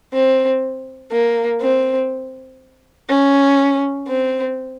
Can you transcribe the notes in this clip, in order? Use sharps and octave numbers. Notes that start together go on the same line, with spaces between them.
C4
A#3
C4
C#4
C4